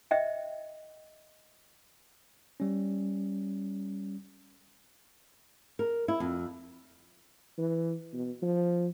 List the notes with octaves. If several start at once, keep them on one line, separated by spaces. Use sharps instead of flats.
D#5 E5 G5
G3 C#4
A#4
E4
F2
E3
B2
F3